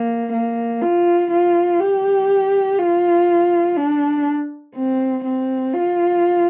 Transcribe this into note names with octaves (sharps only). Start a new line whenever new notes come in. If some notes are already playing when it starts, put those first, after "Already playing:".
Already playing: A#3
A#3
F4
F4
G4
F4
D4
C4
C4
F4